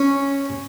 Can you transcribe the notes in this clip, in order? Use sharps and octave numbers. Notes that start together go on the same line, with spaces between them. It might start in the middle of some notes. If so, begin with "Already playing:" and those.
Already playing: C#4